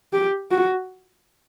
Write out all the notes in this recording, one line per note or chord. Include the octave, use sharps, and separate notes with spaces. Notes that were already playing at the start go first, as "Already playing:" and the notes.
G4
F#4